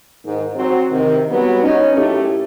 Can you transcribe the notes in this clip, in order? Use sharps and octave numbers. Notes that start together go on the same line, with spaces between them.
G#2 D#3
F#3 C4
C3 D#3
F#3 G3 B3
C#4 D#4
F#2 A2 A3 G4